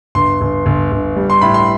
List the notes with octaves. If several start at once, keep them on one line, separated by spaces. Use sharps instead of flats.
G1 C6
G1
G1
G1
G3
C6
A2 B5
C6